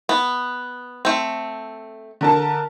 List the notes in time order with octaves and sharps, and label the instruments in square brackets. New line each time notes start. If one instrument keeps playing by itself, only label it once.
[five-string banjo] B3
A3 C4
[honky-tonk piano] D3 A#4 A5